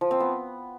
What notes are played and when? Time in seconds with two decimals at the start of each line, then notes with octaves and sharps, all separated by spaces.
0.01 F3
0.11 C4
0.20 B3